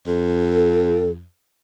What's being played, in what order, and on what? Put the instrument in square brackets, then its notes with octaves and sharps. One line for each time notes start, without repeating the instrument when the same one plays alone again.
[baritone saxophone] F2 [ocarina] A4